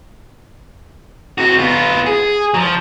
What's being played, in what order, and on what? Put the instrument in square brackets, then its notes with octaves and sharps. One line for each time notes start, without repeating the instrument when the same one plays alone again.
[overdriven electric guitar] C4 F#4
B3 F4
G#4
F3 F#3